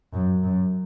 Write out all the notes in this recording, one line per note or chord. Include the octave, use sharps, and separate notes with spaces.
F#2
F#2